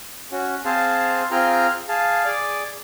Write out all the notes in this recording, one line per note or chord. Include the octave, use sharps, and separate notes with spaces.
C#4 F#4
C4 G#4 C5 F5 A5
C4 F4 G#4 G5 A#5 F6
G#4 F5 A5
G#4 D5 D6